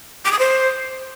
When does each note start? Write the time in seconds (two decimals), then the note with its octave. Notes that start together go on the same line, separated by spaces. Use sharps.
0.25 D6
0.32 D#6
0.39 C5